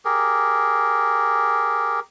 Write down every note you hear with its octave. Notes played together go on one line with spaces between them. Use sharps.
G4 G#4 A#4